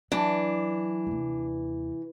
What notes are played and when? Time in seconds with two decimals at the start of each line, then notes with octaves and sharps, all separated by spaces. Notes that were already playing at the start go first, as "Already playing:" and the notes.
0.12 E3 F#3 D4
1.07 D#2 C3